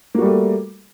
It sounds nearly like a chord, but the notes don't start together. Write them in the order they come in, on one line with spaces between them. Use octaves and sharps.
A#3 F#4 G3 A3